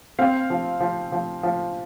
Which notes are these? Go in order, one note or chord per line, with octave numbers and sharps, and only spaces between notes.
C4 F5
F3
F3
F3
F3